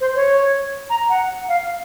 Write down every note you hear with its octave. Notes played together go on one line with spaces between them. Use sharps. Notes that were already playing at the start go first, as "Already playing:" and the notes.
C5
C#5
A#5
F#5
F5